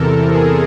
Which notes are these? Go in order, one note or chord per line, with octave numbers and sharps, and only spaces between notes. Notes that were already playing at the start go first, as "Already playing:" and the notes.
Already playing: E2 C3 E3 A4 A#4
G#4